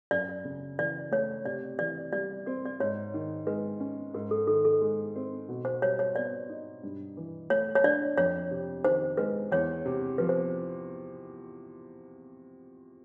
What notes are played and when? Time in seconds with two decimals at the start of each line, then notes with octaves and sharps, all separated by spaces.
0.11 F#2 D5
0.45 C#3
0.79 E3 D5
1.11 A3 C#5
1.45 C3 D5
1.79 E3 D5
2.13 G3 D5
2.46 C4 D5
2.66 D5
2.80 G#2 C#5
3.14 D#3
3.47 G#3 B4
3.80 C#4
4.14 G#2 A#4
4.31 A4
4.47 D#3 A4
4.65 A4
4.81 G#3
5.16 C4
5.49 B2
5.65 C5
5.82 G3 C#5
5.99 C#5
6.16 B3 D5
6.49 D#4
6.83 G2
7.17 E3
7.50 A3 C#5
7.75 C#5
7.84 D4 D5
8.17 F2 C#5
8.51 C3
8.85 D#3 C5
9.17 G#3 B4
9.51 E2 C#5
9.85 C3
10.18 F3 B4
10.29 C5